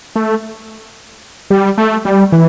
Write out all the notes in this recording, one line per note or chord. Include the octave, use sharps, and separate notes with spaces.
A3
G3
A3
G3
E3